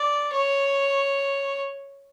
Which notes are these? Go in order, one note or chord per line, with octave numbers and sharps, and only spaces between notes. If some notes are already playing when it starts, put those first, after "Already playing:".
Already playing: D5
C#5